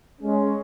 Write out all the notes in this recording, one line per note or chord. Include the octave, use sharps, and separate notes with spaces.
G#3 C#4